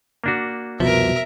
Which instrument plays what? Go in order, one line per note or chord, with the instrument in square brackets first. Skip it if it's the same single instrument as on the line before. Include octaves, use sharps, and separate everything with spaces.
[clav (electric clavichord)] A#3 D4 F#4
[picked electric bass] C2 F2 F3 [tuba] B2 [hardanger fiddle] A#4 E5